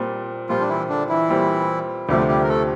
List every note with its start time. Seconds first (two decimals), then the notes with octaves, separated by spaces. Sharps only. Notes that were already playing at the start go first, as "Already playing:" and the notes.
Already playing: A#2 G3 C4
0.49 A#2 F3 G3 C4 F4
0.60 D4
0.69 E3 E4
0.89 D3 D4
1.09 E3 E4
1.29 A#2 G3 C4
2.09 D2 C3 F3 G3 A3 G4
2.28 G3 G4
2.43 A#4
2.48 A3 A4